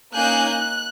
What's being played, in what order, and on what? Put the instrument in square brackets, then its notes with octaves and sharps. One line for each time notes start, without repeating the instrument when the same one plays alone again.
[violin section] A#3 C#4 D#4 G#5 F#6 G6
F#6